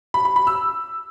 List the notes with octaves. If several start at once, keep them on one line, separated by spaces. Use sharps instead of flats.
B5
B5
B5
E6